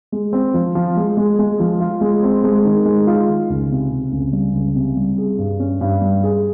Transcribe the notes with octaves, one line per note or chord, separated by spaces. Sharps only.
G#3
C4
F3
F3
G#3
G#3
G#3
F3
F4
G#3
C4
G#3
D#3
G#3
F4
D#3
C#2
C3
C3
C#2
G3
C#2
C3
G3
G#4
G2
C#4
G2
G3
G#4